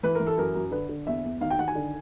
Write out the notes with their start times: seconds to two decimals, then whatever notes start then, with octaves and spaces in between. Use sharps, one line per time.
0.03 E3 B4
0.15 E3 A#4
0.27 A4
0.37 F#2 A#4
0.55 F#2
0.71 D3 B4
0.89 D3
1.07 E2 E5
1.24 E2
1.41 D#3 F5
1.50 G5
1.58 D#3 F#5
1.68 G#5
1.75 D3